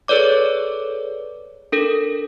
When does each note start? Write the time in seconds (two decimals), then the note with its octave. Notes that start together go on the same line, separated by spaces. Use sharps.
0.08 G#4 A4 B4 C#5 D5 D6
1.72 D4 A4 A#4